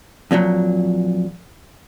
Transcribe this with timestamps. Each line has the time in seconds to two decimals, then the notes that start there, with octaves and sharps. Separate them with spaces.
0.31 F2 A#2 E3 F#3